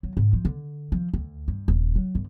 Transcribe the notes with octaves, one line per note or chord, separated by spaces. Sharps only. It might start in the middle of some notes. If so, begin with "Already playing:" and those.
F#3
G#2
F3
D3
F3
D2
G2
D#1
F#3
G1